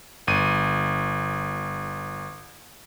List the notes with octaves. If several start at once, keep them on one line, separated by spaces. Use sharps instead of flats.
G1 D#7